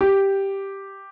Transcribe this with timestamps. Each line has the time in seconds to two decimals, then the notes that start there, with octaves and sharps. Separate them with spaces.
0.01 G4